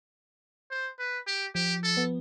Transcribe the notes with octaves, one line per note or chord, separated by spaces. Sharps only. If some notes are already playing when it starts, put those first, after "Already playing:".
C5
B4
G4
F3 G4
A4
B3